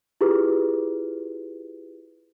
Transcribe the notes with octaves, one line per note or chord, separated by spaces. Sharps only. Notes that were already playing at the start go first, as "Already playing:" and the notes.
E4 F4 G4 G#4 B4